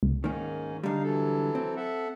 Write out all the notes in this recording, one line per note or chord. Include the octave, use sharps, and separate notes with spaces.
C#2
G#2 D#3 A#3 C#4
D3 G3 D#4 F5
E3 F#3 A4
C4
A4 E5 F#5